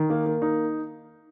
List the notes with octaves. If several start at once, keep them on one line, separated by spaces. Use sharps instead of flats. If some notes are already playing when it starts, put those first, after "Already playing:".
Already playing: D#3
A#3
A#3
D#4